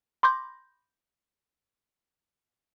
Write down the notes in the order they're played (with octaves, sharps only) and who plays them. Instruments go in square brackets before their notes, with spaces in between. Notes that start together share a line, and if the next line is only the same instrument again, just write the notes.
[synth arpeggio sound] B5 C6 D6 G6 A#6